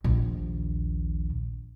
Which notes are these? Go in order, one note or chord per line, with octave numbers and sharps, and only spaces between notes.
A#1 D#2